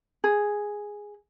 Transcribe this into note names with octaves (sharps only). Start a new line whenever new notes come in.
G#4